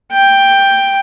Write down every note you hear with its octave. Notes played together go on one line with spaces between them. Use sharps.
G5